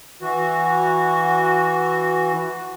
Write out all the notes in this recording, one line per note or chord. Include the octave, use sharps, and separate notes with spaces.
E3 F#4